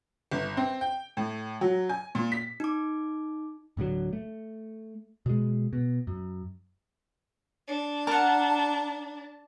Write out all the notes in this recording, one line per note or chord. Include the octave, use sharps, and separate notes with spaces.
G1
C4
G5
A2
F#3
G#5
A#2
B6
D#4 D6
D1 A2 D3 F#3
A3
B2 G#3
B2
F#2
D4
A#4 F#5 A5